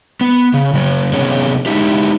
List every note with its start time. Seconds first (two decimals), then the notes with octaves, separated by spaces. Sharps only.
0.21 B3
0.54 C#3
0.73 C#3 F#3
1.13 C3 F#3 B3 C#4 G#4 C#5
1.66 G#3 D#4 E4 G4